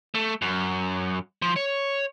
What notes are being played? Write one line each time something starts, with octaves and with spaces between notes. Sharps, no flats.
A3
F#2
F3
C#5